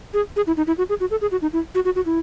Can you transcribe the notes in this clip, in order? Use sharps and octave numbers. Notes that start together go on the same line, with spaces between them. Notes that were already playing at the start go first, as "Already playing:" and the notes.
G#4
G#4
E4
D#4
E4
F#4
G#4
F#4
A4
G#4
F#4
D#4
E4
F#4
F#4
F#4
E4